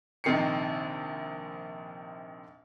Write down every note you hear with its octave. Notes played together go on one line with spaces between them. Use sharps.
A#1 C3 D#3 C7 C#7